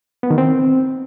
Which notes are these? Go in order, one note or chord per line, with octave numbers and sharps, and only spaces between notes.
B3
D#3
C4